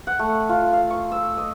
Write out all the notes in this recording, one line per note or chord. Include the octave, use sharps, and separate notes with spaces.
F#5
A3
F4
F5
C#6
E6
D#5